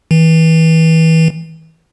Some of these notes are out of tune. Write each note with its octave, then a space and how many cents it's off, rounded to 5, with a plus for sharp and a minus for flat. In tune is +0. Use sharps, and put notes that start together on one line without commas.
E3 -30